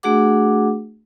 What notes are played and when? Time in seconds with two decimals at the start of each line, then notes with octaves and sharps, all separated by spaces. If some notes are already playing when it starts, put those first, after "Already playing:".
0.03 A3 D4 F#4 G#4 F#5 D6